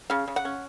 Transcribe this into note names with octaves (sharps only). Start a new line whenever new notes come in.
C#3 F5
C#3
F#5
C#4